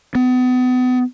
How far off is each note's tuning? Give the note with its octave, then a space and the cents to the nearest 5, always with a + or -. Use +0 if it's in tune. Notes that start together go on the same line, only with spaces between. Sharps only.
B3 +35